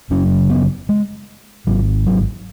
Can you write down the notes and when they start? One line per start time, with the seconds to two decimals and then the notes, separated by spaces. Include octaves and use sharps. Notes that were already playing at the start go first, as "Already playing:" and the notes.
0.10 F#1 F#2 C#3 C#4
0.50 B3
0.89 G#3
1.67 G#1 G#2 F#3
2.06 F#3